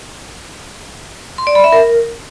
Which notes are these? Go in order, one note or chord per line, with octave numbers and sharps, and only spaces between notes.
C6
D5
B5
E5
A#4